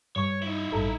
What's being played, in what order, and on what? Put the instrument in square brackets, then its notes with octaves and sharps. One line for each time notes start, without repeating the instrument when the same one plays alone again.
[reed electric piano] G2 C#6 [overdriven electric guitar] C#5
[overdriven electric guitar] D#4 E4
[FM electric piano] A1 G2 [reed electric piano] A4 A#5